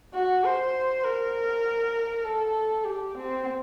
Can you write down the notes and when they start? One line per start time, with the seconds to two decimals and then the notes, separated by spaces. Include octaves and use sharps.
0.14 F#4
0.44 C5
1.04 A#4
2.24 A4
2.84 G4
3.15 C4